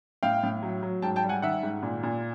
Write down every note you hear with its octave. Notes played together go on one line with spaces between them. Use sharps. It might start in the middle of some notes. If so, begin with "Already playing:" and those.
A2 F5 G5
A2
F#3
F#3
G#2 G5 A5
G5 A5
G3
F#5 G#5
D#3 E5 F#5
G#2
A#2
A#2